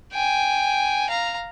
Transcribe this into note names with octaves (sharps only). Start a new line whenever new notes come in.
G5 G#5
F5 A#5